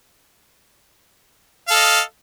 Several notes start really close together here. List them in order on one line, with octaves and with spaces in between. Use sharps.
F5 A4 D#5